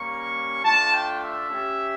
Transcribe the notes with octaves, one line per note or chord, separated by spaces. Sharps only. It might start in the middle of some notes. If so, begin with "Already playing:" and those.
Already playing: G3 A#3 C#4 C#6
A3 D4 F4 A5
G5
E5
C#4 G4